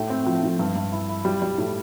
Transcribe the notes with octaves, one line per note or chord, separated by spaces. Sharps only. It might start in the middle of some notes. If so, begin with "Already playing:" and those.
Already playing: A2
C4
F3
A2
G2
G2
E4
E4
G3
G3
A2